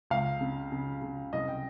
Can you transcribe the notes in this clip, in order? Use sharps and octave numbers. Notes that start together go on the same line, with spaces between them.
C#2 F5
C#3
C#3
C#3
C2 D#5
G5